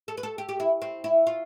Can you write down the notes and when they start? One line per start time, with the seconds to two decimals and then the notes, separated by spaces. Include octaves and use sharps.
0.08 A4
0.17 B4
0.23 A4
0.38 G4
0.49 G4
0.60 E4
0.82 C4
1.04 E4
1.27 F4